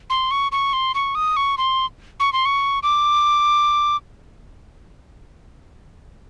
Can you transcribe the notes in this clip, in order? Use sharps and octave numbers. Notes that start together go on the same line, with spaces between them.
C6
C#6
C#6
C6
C#6
D#6
C#6
C6
C#6
C6
C#6
D6